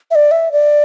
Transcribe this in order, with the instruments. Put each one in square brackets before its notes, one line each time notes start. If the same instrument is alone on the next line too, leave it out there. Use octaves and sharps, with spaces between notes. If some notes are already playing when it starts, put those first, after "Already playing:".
[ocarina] E5
D5
E5
D5